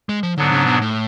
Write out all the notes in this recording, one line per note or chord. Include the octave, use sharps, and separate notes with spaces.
G#3
F3
G#2 D3 F#3 B3 D4
C#3
B2
A2